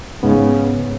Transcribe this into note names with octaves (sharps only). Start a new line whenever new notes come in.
G#2 C#3 B3